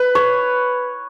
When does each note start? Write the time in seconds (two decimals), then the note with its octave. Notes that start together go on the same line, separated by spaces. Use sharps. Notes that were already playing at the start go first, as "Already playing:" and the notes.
Already playing: B4
0.15 C#5